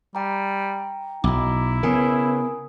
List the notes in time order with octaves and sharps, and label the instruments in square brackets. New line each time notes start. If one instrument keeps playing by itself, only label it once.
[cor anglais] G3 [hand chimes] G5 A#5
[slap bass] B1 [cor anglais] E4 [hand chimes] A#5 D6
[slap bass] C#3 [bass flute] B3 [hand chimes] A#4 G#5 D#6